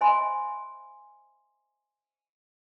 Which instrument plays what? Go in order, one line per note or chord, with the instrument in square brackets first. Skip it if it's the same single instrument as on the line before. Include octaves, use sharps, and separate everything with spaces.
[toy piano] C5 D#5 E5 G#5 B5 C6